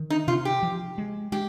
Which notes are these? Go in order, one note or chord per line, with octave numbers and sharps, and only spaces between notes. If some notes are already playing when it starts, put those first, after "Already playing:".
Already playing: D#3
D#4
C3 F4
G4
F3
G#3
G#3 G4